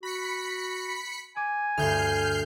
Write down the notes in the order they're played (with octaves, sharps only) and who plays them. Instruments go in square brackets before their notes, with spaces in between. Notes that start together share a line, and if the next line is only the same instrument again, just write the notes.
[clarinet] F#4 [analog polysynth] B5 B6 C#7
[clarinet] G#5 [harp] D6
[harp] D2 G2 [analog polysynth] F6 G6 C7